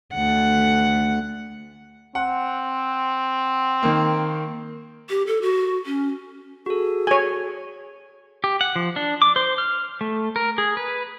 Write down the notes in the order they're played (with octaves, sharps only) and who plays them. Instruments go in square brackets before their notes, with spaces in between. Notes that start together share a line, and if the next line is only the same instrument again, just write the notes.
[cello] D2 F#5
[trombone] C4 [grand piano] F#5
[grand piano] D#3 A#3
[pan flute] G4
A4
F#4
C#4
[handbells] F#4 A4 [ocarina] G#4
[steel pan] C#5 G#5
[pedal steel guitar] G4
F#5
F3
D4
D6
C5
F6
A3
A#4
G#4
B4